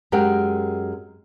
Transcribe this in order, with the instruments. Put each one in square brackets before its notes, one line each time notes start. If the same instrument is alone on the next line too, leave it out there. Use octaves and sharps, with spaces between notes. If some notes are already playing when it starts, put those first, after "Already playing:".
[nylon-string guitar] F#2 G#3 G4 A#4 F#5 G5